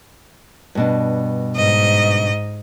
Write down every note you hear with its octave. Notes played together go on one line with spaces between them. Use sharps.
G2 B2 D4
G#2 D#5